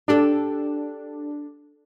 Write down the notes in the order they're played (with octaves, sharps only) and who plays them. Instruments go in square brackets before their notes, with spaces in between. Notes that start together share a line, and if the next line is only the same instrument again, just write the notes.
[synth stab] D4 [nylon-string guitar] G4 A4